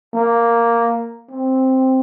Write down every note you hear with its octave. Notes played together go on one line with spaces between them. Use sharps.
A#3
C4